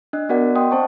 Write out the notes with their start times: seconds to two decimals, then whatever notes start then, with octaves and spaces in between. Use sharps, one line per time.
0.13 D4 D#5 F#6
0.29 B3 F#4 A#4 D5 F#5
0.55 D5 D#5 F#5 G5 C6 D#6
0.71 C4 C5 A5 C#6